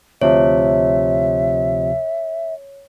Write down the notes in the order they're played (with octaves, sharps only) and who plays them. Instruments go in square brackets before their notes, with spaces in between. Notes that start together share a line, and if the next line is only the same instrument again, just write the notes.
[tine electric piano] D2 C3 F3 [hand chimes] C#5 [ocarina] E5